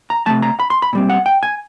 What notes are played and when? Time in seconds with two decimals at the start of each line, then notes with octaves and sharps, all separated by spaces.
0.10 A#5
0.26 C3 E3 A3 A5
0.42 A#5
0.59 B5
0.70 C6
0.82 B5
0.93 A#2 G3 C4
1.09 F#5
1.26 G5
1.43 G#5